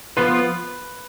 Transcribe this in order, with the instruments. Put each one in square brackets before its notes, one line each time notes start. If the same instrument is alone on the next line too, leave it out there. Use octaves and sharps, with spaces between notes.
[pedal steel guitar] F3 B3 F4 [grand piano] B4